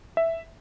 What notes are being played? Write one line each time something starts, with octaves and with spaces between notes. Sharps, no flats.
E5